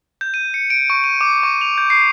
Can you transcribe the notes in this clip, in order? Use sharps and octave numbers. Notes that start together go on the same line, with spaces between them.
G6
D#7
C#7
D7
C#6
D#7
D6
C#6
F7
G6
C7